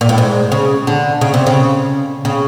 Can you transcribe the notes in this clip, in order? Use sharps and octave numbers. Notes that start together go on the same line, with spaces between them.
A#2
A2
G#2
C#3
D3
C#3
C3
C#3
C#3